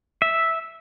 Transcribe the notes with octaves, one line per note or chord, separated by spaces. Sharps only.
E5